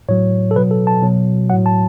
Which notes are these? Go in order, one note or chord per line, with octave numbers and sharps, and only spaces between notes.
A2 F#3 C#5
A4
B2 F#3 B4
A4
A5
B2 F#3
A2 F#3 F#5
A5